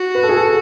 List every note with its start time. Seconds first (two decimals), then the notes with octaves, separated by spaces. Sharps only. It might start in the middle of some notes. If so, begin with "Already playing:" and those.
Already playing: F#4
0.15 B4
0.23 A4
0.29 G#4
0.37 A4